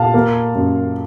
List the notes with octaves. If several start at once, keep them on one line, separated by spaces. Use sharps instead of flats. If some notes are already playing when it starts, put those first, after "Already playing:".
Already playing: A#2 F5 A5
A#3
F#2